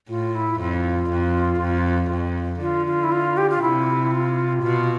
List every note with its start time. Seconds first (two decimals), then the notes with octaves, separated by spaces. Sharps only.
0.09 A2 F4
0.35 E4
0.60 F2 F4
1.10 F2
1.60 F2
2.11 F2
2.61 D3 F4
2.86 F4
3.03 E4
3.12 F4
3.37 G4
3.50 F4
3.62 C3 E4
4.12 F4
4.63 B2 F4